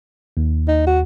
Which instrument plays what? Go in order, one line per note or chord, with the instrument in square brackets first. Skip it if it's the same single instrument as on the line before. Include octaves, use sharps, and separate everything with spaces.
[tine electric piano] D#2
[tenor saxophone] D#4
F#4